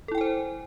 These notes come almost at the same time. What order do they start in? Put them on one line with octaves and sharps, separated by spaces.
A4 E4 G5 G#5 C5